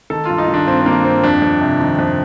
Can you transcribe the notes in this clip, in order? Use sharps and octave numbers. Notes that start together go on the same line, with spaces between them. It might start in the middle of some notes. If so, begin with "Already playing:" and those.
D#3 A4
G2 F4
D#4
D#3
D4
G2 C4
C4
D#3 A#3
G2 C4
F2 D4
F2
C3
D#3
F2